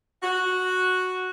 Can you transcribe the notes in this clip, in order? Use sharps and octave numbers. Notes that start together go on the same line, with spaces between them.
F#4